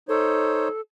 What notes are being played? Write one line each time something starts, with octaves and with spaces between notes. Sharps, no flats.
D#4 A4 C5 C#5